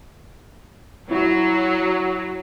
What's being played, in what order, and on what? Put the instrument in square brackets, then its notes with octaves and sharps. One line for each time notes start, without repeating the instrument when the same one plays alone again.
[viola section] F#3 [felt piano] E4